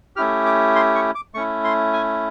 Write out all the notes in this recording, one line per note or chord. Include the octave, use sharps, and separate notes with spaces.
A3 C#4 E4 G4 F6
D6
C6
C#6
D6
A3 C#4 E4 C#6
C6
G#5